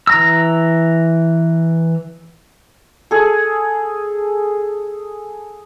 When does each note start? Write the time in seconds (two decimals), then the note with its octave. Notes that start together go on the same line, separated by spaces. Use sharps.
0.07 E3 A#5 E6
3.11 G#4 A4